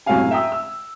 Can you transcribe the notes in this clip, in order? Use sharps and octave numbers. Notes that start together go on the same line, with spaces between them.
F#2 A2 C3 C#5 F5 G#5
E5 G5 A#5 D#6 E6
E6